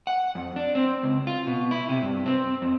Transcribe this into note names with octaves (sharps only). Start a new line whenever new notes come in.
F#5
F2
D4
C4
C#2
F4
B2
E4
C3
G2
C4
F2